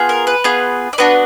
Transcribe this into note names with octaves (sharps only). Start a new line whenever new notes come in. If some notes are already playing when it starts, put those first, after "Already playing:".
Already playing: B3 F4 G#4
A#4
B4
B3 F4 G#4
D5
B3 D4 F#4 B4